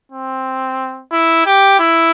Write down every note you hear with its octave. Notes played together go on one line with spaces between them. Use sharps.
C4
E4
G4
E4